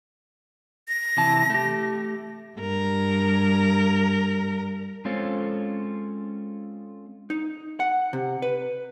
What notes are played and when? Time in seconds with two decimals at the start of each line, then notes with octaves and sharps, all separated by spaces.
0.88 A#6
1.17 C3 E3 A5
1.50 A3 G4
2.57 G2 A#4
5.05 G#3 C4 C#4 F4 A4 C5
7.30 D#4
7.80 F#5
8.13 C3
8.42 B4